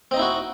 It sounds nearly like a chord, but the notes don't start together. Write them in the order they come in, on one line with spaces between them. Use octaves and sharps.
C4 D#5 D#4 E4 F#4